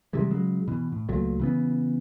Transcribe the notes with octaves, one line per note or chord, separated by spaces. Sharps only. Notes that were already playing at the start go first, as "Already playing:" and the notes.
C3 E3 G3 G#3
C#3 F#3 G#3
B2 E3
A2
C#2 A#2 F#3 A3
C#3 E3 B3